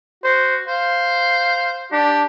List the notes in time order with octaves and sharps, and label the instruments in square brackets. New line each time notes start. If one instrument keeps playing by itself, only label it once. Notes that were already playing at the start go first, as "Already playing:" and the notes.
[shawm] F#4 [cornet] C5
[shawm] C5 [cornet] F5
[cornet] D4 [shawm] G4